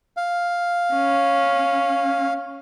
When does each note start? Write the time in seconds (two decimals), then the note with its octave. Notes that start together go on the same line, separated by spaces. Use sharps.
0.17 F5
0.94 C#4